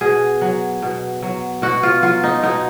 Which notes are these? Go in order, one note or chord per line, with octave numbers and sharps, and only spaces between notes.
B2 G#4
F#3
B2
F#3
B2 F#4
F4
F#3 F4
D#4
B2 D#4